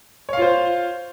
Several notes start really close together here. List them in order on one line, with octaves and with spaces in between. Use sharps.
C#5 F5 F4 C5